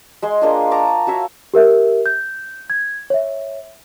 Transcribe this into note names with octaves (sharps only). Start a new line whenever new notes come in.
G#3 G#4 C6
G#3 A#3 D4 F4
A5 A#5 C#6 D6
F#4 C#5 E5 F5
G4 A#4 E5
G6
G#6
C#5 E5